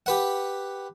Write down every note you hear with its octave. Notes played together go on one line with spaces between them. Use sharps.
G4 B4 F#5